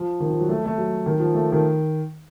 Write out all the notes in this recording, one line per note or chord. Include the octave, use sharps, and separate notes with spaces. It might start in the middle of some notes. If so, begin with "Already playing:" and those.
Already playing: F3
D#3
F3
F#3
A3
A3
F#3
D#3
F3
A3
D#3